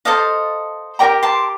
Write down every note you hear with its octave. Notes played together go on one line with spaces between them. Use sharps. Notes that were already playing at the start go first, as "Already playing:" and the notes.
A4 C5 D#5 F5 A5
G4 A#4 D5 G5 A#5
A5 C6